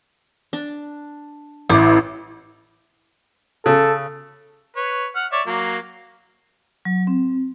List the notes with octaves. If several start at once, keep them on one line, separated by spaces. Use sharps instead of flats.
D4
A1 E4 D6
C#3 A4
B4 C#5
F#5 F6
C#5 D5 E5
F#3 A#3
F#3
C4